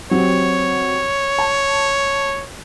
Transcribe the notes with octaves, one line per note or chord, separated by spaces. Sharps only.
F#3 C4 G4 C#5
A5